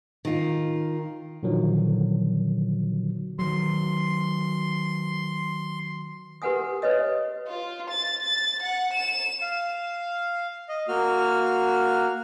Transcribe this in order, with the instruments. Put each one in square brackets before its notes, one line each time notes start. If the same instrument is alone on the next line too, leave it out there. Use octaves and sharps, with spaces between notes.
[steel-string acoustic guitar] D#3 F4
[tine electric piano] A#2 D3 D#3 F3 F#3
[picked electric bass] D#3 F#3 [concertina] C6
[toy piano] G4 A#4 B4 F#5 G#5 D#6
B4 C#5 D#5 D#6
[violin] F4
A6
A6
F#5
E7
[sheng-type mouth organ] F5
D#5
A#3 F#4 F6